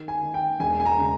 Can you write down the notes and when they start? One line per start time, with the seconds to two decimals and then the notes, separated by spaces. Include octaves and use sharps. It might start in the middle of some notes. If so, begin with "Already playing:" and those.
Already playing: D#3
0.08 G#5
0.21 D#3
0.34 G5
0.60 E1 G#5
0.80 G#5
0.85 A#5
0.98 C#3